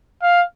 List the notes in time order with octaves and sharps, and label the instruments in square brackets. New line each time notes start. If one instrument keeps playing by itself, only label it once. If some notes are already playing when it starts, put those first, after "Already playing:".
[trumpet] F5